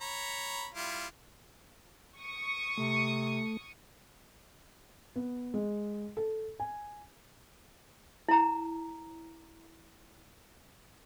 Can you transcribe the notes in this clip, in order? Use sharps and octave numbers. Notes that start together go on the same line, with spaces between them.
C#5 A#5 B5
G3 E4 F4
C#6 D#6 C#7
C3 A3
B3
G#3
A4
G#5
E4 A#5